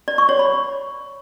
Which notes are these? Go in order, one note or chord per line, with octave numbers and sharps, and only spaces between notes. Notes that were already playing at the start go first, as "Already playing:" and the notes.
D5
C#6
C#5
B5